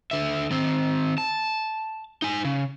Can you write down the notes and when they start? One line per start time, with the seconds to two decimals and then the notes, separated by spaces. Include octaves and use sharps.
0.11 D3 E5
0.51 D#3 C4
1.18 A5
2.22 D#4 G#5
2.45 C#3